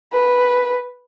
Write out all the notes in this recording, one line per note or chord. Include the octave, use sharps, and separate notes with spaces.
B4